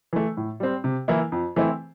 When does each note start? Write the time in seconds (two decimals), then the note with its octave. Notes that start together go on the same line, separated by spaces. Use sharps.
0.13 E3 A3
0.37 A2
0.60 G3 C4
0.84 C3
1.08 E3 A#3 E4
1.32 F2
1.56 E3 A3 C4 E4